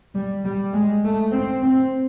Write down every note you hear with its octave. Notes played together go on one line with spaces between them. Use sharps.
G3
G3
G#3
A3
C4
C4